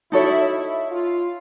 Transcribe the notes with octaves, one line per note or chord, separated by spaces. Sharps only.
D#4 E4 F#4 A4 C#5
E4
F4